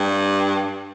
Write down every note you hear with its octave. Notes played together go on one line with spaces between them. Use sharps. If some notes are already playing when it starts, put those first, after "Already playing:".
Already playing: G2